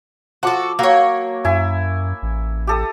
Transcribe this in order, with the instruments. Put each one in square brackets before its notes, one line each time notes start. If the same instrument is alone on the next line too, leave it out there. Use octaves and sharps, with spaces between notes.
[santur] F3 D6 [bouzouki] F#4 A4
[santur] F#3 [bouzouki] A#3 C#5
[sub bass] F#2 [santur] E4 G#5
[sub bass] A1
[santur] G4 A4 D#6